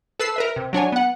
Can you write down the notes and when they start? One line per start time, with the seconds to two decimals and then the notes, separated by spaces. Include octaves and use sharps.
0.20 A4 B4 E6 C7
0.36 A#4 B4 E5
0.56 C3
0.73 F#3 D4 C#5 G#5
0.92 B3 F#5